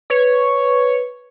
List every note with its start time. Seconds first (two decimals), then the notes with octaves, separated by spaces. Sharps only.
0.10 B4 C#5